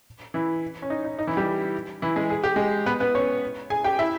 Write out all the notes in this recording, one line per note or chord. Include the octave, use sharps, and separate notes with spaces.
E3 E4
C#4
D#4
D#4
D#4
E3 E4
G3 G4
E3 E4
G#3 G#4
G#4
G4
G#3 G#4
B3 B4
B3 B4
C#4 C#5
G#4 G#5
G4 G5
E4 E5